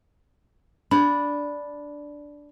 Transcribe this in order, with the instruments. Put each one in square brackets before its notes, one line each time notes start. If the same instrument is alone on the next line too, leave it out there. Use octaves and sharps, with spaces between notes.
[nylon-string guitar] D4 [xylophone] B5